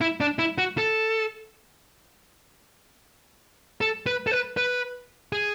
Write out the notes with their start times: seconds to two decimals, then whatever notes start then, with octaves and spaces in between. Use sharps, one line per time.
0.01 E4
0.20 D4
0.39 E4
0.58 F#4
0.78 A4
3.81 A4
4.07 B4
4.27 A4
4.32 B4
4.57 B4
5.33 G#4